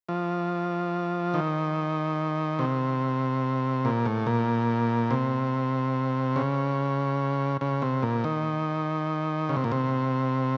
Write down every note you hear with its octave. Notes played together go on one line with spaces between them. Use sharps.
F3
D#3
C3
A#2
A2
A#2
C3
C#3
C#3
C3
A#2
D#3
C#3
C3
A#2
C3